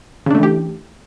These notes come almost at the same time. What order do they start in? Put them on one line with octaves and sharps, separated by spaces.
C#3 D4 A3 E3 G4